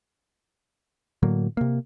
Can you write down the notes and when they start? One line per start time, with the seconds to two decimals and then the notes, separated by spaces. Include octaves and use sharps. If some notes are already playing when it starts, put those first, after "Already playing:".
1.23 A2 D3 F#3 A#3
1.57 C3 A#3